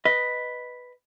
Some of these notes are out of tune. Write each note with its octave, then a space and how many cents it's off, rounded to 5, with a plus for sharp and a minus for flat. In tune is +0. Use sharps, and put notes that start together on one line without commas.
B4 +0 D#5 +0